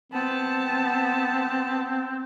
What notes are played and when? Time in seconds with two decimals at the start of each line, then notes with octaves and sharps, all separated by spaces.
0.12 B3 C4 A5